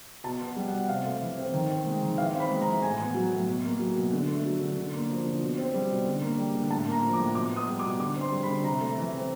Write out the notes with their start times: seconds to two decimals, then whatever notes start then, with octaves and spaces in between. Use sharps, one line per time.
0.24 B2 A5
0.41 B3
0.56 G3
0.68 F#5
0.72 B2
0.89 C3 F5
1.05 A3
1.21 E3
1.37 C4
1.54 D#3
1.70 C4
1.86 G#3
2.03 D#3
2.18 E3 F5
2.35 C4
2.40 B5
2.51 G#3
2.61 A#5
2.67 E3
2.82 A2 G#5
3.00 B3
3.15 F#3
3.32 A2
3.47 B2
3.64 A#3
3.79 F#3
3.96 B2
4.13 D3
4.28 A3
4.45 F#3
4.61 D3
4.77 D3
4.94 A#3
5.10 F3
5.25 D3
5.41 B2
5.58 C4
5.74 G3
5.90 B2
6.06 D3
6.22 A#3
6.38 G3
6.55 D3
6.70 A2 A5
6.87 A#3 A#5
7.03 F3
7.13 D6
7.20 A2
7.35 B2 D6
7.52 B3 D#6
7.68 G3
7.79 D6
7.84 B2
8.00 D3 D6
8.16 C4
8.21 C6
8.32 G3
8.43 B5
8.49 D3
8.64 C3 A#5
8.80 A3
8.98 E3
9.13 C4